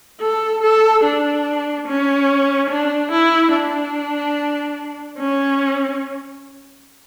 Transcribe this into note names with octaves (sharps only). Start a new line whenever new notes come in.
A4
A4
D4
C#4
D4
E4
D4
C#4